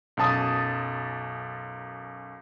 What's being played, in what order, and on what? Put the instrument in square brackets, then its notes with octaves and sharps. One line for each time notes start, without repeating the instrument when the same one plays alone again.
[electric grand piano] B1 F#2 A5 D#6